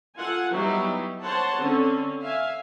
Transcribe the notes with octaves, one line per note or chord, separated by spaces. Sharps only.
F4 A4 F#5 G#5
F#3 G3 B3 D#4 E4 G4
C5 C#5 F#5 A5 C6
D3 C4 C#4
E5 F5 G#5